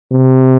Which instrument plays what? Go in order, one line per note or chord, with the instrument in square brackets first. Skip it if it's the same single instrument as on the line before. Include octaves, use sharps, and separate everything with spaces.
[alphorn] C3